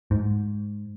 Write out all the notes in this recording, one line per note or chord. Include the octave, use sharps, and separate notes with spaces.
G#2